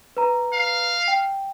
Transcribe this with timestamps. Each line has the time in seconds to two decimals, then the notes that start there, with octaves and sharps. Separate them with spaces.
0.17 B4 A#5
0.53 F5
1.08 G5